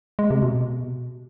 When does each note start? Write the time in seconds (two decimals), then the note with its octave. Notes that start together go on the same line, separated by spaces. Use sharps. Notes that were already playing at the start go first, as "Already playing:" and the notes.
0.19 G#3
0.30 C3
0.42 B2